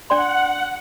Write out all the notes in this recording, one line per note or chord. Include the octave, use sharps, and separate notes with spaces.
D4 D5 F#5 C6